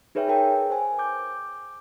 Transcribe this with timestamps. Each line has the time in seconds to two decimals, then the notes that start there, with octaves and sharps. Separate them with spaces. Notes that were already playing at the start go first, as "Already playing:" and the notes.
0.15 D#4 G#4 B4 C#5 E5 G5
0.28 G#4 A#4 G5 A5
0.70 C5 G#5
0.99 D6 G6